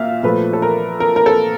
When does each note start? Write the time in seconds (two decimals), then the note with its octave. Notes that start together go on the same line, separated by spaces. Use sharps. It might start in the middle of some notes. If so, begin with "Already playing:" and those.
Already playing: A#2 E5 F5
0.23 A#2 F3 A3 B4
0.53 A4
0.62 A#4
1.00 A#4
1.16 A#4
1.26 A4